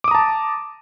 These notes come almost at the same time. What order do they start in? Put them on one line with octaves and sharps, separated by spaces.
D6 D#6 A#5 A5